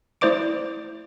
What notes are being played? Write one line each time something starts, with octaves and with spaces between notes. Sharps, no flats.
A3 E4 C5 D5 D6 D7